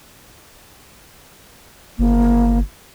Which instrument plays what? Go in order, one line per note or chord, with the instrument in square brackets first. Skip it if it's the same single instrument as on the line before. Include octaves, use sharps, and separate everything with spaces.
[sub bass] G1 [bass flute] A#3